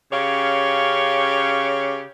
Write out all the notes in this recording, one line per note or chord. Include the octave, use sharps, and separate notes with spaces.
C#3 C#4 G4 C#5 F5